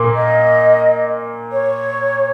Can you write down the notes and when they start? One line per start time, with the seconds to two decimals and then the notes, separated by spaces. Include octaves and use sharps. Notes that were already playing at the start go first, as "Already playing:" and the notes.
Already playing: A#2 A#3
0.15 D#5
1.52 C#5